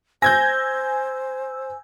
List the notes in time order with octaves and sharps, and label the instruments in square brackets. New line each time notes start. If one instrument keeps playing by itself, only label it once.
[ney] C5 [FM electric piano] G#5 E6 [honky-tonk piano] G6 G#6 A#6